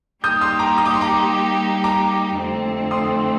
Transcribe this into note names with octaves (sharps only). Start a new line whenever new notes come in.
G3 A#3 D#4 G4 D#6 G6
C6 D#6
A#5 D6
D#6
D6
C6
A#5 D6
A#5 D6
F2 D3 A3 C4
C6 D#6